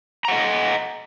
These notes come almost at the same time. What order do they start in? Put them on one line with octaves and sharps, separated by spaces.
A#5 F#5 D#5